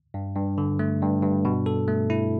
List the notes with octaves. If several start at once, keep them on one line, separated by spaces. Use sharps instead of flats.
G2
G2
D3
A3
G2
G2
B2
A4
A3
E4